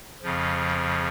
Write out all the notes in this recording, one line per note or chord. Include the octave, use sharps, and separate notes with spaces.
F2 C#3 F3